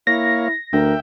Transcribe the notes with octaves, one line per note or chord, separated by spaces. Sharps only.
A#3 E4 C#5 F5 A#6
D2 A#4 E5 G5